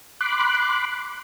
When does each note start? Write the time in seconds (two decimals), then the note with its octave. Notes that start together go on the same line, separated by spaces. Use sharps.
0.21 B5 C6 D6 F#6